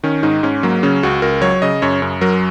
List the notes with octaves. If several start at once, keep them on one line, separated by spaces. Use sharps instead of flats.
D#3 C#4
G#2 D#4
G#2 C#4
F#3 A#3
C#3 C#4
C#2 F#4
C#2 A#4
F#3 C#5
C#3 D#5
F#2 C#5
F#2
F#3 A#4